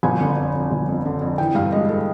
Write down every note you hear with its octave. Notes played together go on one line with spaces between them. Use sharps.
G1 G#5
D3
F2
F2
G1
F2
D3
F2
E3 G5
G2 F5
G#3 D#5
A4